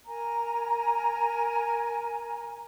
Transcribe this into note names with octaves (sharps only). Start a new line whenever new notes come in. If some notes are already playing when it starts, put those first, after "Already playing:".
A#4 G#5 A#5